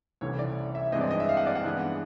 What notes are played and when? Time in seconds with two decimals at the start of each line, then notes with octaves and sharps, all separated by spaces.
0.21 C2 C3 E3 A3 C#4 C#5
0.39 D5
0.75 E5
0.92 G2 E3 G#3 C4 D#5
1.01 D5
1.11 D#5
1.20 E5
1.29 F5
1.37 F#5
1.47 D5
1.55 F#5
1.64 G2 E3 G#3 B3